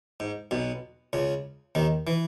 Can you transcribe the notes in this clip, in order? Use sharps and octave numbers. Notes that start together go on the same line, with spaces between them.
G#2
B1 B2
C#2 C#3
D#2 D#3
E3